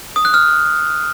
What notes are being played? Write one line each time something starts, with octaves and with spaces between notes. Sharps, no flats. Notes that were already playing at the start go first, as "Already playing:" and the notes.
D#6
F#6
F6